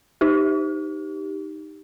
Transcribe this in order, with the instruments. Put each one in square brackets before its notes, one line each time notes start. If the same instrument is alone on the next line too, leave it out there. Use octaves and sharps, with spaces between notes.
[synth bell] D#4 G4